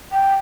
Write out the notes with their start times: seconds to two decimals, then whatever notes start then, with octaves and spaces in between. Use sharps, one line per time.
0.12 G5